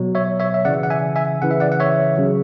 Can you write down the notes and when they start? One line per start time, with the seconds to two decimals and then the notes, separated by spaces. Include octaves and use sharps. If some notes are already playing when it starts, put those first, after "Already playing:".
Already playing: B2 F#3
0.15 C#5 E5
0.40 C#5 E5
0.54 E5
0.65 C#3 E3 D5 F#5
0.83 F#5
0.90 E5 G#5
1.16 E5 G#5
1.42 C#3 E3 F#5
1.51 E5
1.60 D5 F#5
1.72 F#5
1.80 C#5 E5
2.17 C#3 F#3